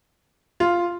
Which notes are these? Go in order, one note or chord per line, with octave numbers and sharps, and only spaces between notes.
F4